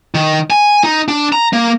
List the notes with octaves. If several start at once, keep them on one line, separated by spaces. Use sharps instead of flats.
D#3
G#5
D#4
D4
A#5
A#3